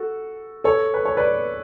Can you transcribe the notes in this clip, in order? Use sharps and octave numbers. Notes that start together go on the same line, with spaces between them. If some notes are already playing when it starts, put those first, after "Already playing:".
Already playing: F#4 A4
A4 C#5
B4
C#5
B4 D5